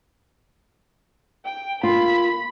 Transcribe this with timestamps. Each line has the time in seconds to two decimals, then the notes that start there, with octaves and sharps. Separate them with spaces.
1.45 G5
1.83 A#3 F4 B5